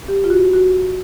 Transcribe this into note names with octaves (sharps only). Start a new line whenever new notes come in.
G4
F4
F#4
F#4